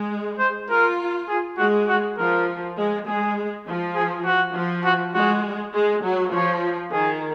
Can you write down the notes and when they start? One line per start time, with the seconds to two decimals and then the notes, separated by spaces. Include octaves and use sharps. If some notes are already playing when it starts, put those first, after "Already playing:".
Already playing: G#3
0.39 C5
0.69 F4 A#4
1.29 G#4
1.58 G#3 F#4
1.88 F#4
2.18 F3 A#4
2.77 G#3
3.07 G#3 G#4
3.66 F3
3.95 G#4
4.25 F#4
4.54 F3
4.85 F#4
5.14 G#3 F#4
5.73 G#3
6.03 F#3
6.32 F3 C#5
6.92 D#3 G#4